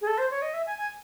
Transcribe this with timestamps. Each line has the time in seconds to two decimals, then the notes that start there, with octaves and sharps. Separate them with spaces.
0.01 G#4
0.07 A4
0.18 C5
0.31 C#5
0.42 D#5
0.54 E5
0.67 G#5
0.78 G#5